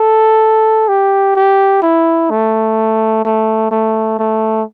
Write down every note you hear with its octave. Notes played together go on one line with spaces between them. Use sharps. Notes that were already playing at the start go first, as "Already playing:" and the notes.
Already playing: A4
G4
G4
E4
A3
A3
A3
A3